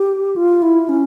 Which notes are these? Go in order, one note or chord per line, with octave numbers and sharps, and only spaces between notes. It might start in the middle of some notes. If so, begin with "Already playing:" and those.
Already playing: G4
F4
E4
C#4